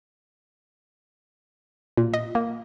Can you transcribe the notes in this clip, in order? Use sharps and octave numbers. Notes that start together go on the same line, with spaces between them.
A#2
D#5
A#3